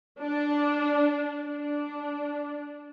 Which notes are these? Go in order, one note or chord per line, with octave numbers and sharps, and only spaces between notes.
D4
D4